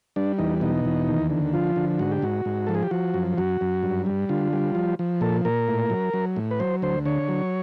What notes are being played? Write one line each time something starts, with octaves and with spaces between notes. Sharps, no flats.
G3 D4
E2 D#4
B2 D#4
E2
D#2
D3
F3 F4
D3
G#2 F#4
G4
G#2 F#4
G#2
F3 A4
G#4
G4
F3 F#4
F#2
F#2 F#4
F#2
G2
G3
D3 F4
G3
F3
F3
A#2 A4
A#2 A#4
A2
F#3
F#3
A2
B4
F#3 C5
D2 C5
D3 C#5
F#3